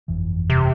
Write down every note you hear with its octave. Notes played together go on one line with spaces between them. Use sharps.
G1 F2 E3
C3